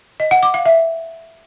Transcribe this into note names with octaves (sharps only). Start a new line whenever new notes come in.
D#5
F#5
D6
F5
E5